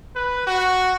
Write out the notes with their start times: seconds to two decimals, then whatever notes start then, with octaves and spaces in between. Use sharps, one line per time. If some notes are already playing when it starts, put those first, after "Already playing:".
0.16 B4
0.47 F#4